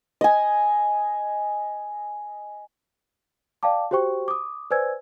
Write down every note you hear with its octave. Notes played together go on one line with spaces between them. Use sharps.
D#5 G#5
D5 F5 G5 A5 D6
F#4 G4 C5 G5 C#6
D6 D#6
B4 C5 D5 G#5 E6 G#6